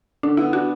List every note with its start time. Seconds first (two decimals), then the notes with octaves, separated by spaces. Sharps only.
0.23 D3 D4
0.37 B3 E4
0.53 D4 F#4